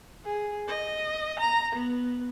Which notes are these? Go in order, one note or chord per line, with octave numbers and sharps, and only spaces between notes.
G#4
D#5
A#5
B3